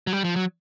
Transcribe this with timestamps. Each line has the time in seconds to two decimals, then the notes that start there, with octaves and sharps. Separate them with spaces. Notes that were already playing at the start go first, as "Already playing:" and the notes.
0.07 F#3
0.13 G3
0.24 F3
0.36 F#3